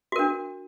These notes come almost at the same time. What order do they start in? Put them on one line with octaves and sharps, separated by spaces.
F#4 A#4 D4